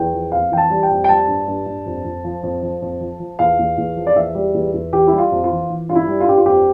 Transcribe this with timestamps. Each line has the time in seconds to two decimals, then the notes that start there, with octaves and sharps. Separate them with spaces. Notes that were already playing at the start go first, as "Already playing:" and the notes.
Already playing: E2 G5
0.13 F3
0.32 F2 F5
0.51 E3 G5
0.57 A5
0.70 G3
0.83 G5
0.90 F2
1.04 G5
1.09 G3 A5
1.28 G2
1.47 G2
1.66 G2
1.86 F2
2.04 F2
2.24 F3
2.43 F2
2.62 F3
2.82 F2
3.00 F3
3.20 F3
3.39 E2 F5
3.58 E2
3.77 E2
3.96 F3
4.07 D5
4.15 E2 E5
4.35 G3
4.54 E2
4.73 E2
4.93 E3 G4
5.07 G3 E4
5.18 F4
5.31 F2
5.44 F4
5.50 E3
5.70 E3
5.89 G2 F4
5.95 E4
6.07 G3
6.20 F4
6.27 G2 G4
6.37 F4
6.46 F2 G4